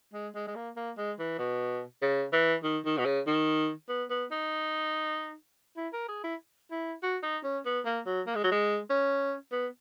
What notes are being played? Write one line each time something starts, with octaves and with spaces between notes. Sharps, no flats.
G#3
G#3
G#3
A#3
A#3
G#3
E3
B2
C#3
E3
D#3
D#3
B2
C#3
D#3
B3
B3
D#4
E4
A#4
G#4
E4
E4
F#4
D#4
C#4
B3
A#3
F#3
A#3
G#3
F#3
G#3
C#4
B3